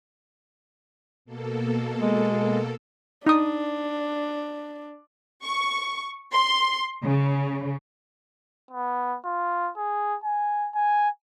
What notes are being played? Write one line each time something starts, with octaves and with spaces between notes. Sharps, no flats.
B2 A#3 A4
G#3
D4 D#4 D#6
C#6
C6
C#3
B3
F4
G#4
G#5
G#5